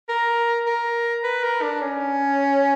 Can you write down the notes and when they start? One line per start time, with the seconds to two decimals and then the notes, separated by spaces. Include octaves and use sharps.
0.09 A#4
0.66 A#4
1.24 B4
1.43 A#4
1.62 D4
1.81 C#4